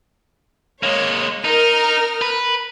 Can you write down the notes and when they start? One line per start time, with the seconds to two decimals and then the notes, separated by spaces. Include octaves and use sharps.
0.83 G#3 A#3 C#5
1.45 D#4 A#4 F6
2.22 B4